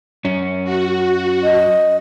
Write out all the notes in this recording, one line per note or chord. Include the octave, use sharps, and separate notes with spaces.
F#2 C#4
F#4
D#5